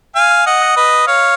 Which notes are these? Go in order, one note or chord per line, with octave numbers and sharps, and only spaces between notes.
F5 G#5
D#5 F#5
B4 D#5
C#5 F5